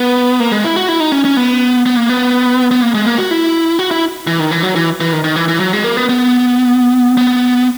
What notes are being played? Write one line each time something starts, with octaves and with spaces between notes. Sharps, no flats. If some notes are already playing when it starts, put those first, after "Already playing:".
Already playing: B3
A#3
G#3
E4
F#4
E4
D#4
C#4
C#4
B3
B3
A#3
B3
B3
A#3
G#3
A#3
F#4
E4
F#4
E4
E3
D#3
E3
F#3
E3
E3
D#3
D#3
E3
E3
F#3
G#3
A#3
B3
B3
B3